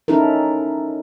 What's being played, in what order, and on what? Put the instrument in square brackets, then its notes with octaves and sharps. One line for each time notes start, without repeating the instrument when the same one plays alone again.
[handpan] C#4 D#4 E4 A4 A#4